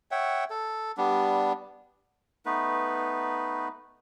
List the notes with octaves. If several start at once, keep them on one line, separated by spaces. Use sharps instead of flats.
C#5 E5 F#5 G5
A4
G3 B3 D4
A3 B3 D#4 B4